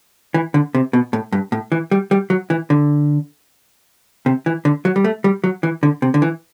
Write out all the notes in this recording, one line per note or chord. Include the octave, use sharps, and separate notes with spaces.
E3
D3
C3
B2
A2
G2
A2
E3
G3
G3
F#3
E3
D3
C3
E3
D3
F#3
G3
A3
G3
F#3
E3
D3
C3
D3
E3